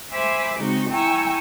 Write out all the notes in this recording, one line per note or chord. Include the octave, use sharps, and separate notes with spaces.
C5 E5 G#5 B5 C6 D6
C#3 G#3 C4 D#4 F#4
E4 G5 G#5 A#5 C#6 E6